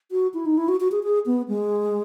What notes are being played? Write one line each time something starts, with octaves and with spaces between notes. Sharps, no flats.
F#4
E4
D#4
E4
F#4
F#4
G#4
G#4
B3
G#3